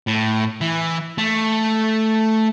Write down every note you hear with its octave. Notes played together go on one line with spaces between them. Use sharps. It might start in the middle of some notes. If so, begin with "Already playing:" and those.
A2
E3
A3